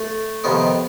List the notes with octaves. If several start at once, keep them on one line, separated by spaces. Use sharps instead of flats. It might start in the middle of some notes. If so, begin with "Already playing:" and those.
Already playing: A3
F2 C3 D#3 B3